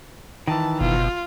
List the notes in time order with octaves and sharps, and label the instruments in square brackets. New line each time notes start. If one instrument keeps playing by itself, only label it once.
[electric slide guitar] D#3 E3 [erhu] A5
[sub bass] F#1 [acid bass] B2 [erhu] F4